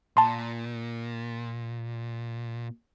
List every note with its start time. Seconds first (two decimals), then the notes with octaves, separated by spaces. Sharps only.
0.17 A#2 A5 C6